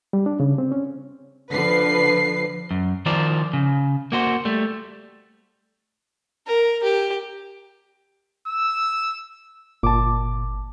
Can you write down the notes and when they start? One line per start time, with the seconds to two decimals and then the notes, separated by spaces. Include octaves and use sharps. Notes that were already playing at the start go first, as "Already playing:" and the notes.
0.13 G3
0.26 D4
0.40 C#3
0.58 C4
0.72 C#4
1.51 D3 F3 B4 C7
2.71 F#2
3.06 D#3 F3 A#4 C5 D5
3.53 C#3
4.12 A#3 F#4 C5
4.45 G3 A3
6.47 A#4
6.83 G4
8.48 E6
9.83 G1 A#2 A5 D6